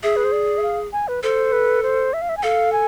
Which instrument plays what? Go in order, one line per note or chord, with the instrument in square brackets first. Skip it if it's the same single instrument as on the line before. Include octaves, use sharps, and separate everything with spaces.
[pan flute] G#4 [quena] E5
[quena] B4
C5
D5
E5
F5
G#5
B4
[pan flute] A4 [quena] C5
[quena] B4
C5
E5
F5
E5
G#5
[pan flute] A4 [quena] F5
[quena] G#5